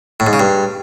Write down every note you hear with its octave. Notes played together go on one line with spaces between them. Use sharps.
A2
G#2
C#3
G2